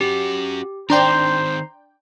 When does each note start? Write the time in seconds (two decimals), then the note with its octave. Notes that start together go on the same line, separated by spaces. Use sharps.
0.01 C#4 F#4 G4
0.90 D#3 C4 D4 C5 D5 G5 A#5 C6